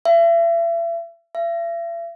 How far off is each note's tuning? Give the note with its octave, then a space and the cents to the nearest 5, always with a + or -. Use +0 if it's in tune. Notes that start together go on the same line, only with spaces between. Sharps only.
E5 +35
E5 +40